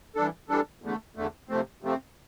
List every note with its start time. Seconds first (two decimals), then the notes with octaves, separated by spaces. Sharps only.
0.15 E3 G3 D4 A4
0.49 E3 G3 D4 A4
0.82 E2 D3 A3
1.15 E2 D3 A3
1.49 C3 F3 A3 C4
1.82 C3 F3 A3 C4